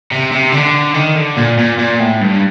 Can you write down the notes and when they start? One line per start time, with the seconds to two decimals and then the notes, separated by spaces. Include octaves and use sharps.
0.11 C3
0.32 C3
0.53 D3
0.94 D#3
1.16 D3
1.37 A#2
1.58 A#2
1.78 A#2
2.00 A2
2.21 G2